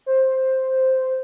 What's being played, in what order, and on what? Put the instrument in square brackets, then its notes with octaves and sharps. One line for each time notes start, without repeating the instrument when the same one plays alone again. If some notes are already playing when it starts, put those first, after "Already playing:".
[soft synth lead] C5